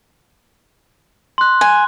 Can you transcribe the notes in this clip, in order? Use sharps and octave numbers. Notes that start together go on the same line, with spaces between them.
C6 F#6
G#5